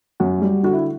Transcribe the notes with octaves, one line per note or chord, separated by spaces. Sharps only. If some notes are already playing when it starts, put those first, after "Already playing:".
F#2 F#4
G3
D3 F#4
E4